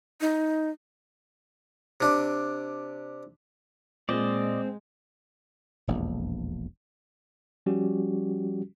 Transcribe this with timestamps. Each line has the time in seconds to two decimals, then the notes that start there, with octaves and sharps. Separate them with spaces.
0.21 D#4
2.01 C3 D4
4.09 A#2 G#3 C4 D5 D#5
5.87 E1 A#1 F2
7.66 F3 G3 C#4 F#4 G4